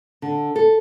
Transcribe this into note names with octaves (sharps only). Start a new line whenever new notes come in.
D3
A4